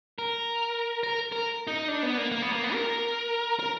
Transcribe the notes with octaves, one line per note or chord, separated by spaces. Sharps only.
A#4
A#4
A#4
D#4
D4
B3
A#3
A#3
B3
A#3
B3
A#4
A#4